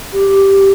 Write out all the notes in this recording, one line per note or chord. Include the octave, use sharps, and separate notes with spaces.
G4